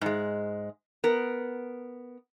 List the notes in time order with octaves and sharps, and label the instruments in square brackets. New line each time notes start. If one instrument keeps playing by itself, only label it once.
[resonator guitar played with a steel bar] G#2 G#3
B3 A#4